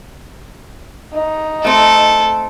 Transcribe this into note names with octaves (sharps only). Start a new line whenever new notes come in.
D#4
A3 C4 A4